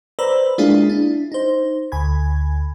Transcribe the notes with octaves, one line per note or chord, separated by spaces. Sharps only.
B4 C5 D5 A#5 B5 E6
G#3 A#3 D4 E4 F4 G#4
D4 E4
D#4 C5
D2 G#5 B5 G#6